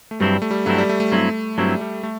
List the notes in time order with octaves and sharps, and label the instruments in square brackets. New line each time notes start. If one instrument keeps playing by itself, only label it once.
[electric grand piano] A3
[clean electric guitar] G2 F#3 C4 E4 [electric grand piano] G3
[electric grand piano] A3
G3
[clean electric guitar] G2 F#3 C4 E4 [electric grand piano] A3
[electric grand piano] G3
A3
A3
[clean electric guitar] G2 F#3 C4 E4
[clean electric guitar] G2 F#3 C4 E4 [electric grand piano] G3
[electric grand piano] G3
A3